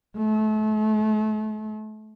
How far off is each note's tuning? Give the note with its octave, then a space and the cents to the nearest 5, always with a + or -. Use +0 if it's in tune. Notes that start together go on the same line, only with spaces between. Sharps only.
A3 -35